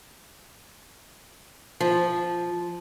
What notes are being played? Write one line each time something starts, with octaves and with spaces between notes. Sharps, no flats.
F3